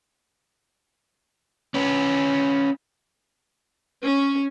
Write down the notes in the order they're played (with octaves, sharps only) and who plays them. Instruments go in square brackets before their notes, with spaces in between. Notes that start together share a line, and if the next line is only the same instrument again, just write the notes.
[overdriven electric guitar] C#4 B4
[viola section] C#4